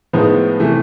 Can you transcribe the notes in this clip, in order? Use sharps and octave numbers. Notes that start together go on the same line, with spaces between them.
A2 F3 G#3 B3 D#4
C3 E3 A3